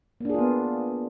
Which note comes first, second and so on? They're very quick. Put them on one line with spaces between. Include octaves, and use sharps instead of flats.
A#3 D4 G#4 F4 B3